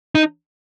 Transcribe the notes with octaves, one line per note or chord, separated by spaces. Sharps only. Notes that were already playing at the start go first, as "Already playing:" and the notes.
D#4